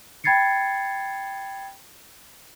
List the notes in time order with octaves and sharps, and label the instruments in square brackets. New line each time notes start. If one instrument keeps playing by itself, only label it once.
[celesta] G5 B5 G#6 A6 C7 C#7